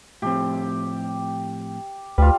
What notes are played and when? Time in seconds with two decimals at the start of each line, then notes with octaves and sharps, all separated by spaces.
0.22 A2 F3 C4 G4
2.18 D2 G3 F4 B4